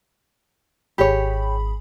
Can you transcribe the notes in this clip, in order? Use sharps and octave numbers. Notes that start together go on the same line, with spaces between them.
G#1 G4 G#4 C#5 B5